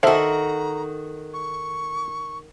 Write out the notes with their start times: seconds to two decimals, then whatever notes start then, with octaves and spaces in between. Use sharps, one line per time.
0.03 D#3 F#4 A4 C5 E5 A#5
1.34 C#6